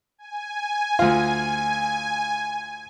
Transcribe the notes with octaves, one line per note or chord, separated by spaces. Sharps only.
G#5
D2 F4